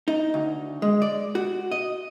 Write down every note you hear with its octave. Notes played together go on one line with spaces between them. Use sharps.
D#4
D2
G#3
D5
F#4
D#5